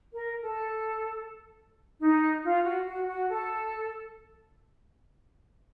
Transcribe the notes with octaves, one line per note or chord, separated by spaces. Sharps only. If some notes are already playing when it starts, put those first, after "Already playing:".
A#4
A4
D#4
F4
F#4
F#4
F#4
A4